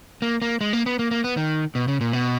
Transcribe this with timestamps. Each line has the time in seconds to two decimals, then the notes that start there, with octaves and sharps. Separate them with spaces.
0.22 A#3
0.42 A#3
0.61 G#3
0.73 A#3
0.86 B3
0.99 A#3
1.11 A#3
1.24 B3
1.37 D#3
1.75 B2
1.88 C#3
2.01 A#2
2.13 B2